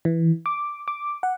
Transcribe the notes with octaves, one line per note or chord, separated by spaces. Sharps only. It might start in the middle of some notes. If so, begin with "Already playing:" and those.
E3
D6
D6
F#5